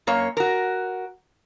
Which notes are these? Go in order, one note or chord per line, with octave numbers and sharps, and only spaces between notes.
F#2 A#3 C#5
F#4 A#4